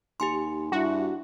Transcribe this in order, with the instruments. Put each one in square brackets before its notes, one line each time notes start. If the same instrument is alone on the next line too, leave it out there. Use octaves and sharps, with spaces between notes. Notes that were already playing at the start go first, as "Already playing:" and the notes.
[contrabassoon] D#2 [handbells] G4 G#5 C6
[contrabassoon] G2 [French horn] E4 [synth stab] F#4